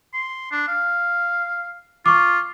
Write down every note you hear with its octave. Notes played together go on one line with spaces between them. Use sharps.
C6
D4
F5
F4 C#6 D6